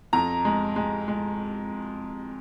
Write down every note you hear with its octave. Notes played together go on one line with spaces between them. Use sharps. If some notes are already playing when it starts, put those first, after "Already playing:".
F2 A#5
G#3
G#3
G#3